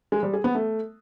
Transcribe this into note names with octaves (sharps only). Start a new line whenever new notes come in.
G#3
G3
G#4
B3
A3